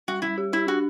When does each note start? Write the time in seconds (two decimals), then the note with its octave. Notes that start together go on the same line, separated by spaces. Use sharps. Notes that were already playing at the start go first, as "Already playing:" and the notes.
0.08 G3 F#4
0.22 G3 E4
0.38 G4
0.53 E4 G4
0.67 D4 F#4